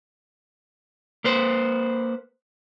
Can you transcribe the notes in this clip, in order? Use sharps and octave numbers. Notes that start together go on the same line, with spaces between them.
A#3 B4 C5